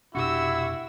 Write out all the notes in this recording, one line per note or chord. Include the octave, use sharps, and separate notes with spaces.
F1 B2 D4 E4 F#4 G4 E6